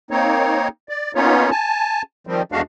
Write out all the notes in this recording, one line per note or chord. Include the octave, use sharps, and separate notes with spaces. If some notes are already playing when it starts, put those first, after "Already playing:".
A#3 C4 D#4 C#5
D5
A#3 B3 C#4 D#4 F4 C#5
G#5 A5
D#3 F3 G3 C4
E2 G#3 A3 D4 F#4 F5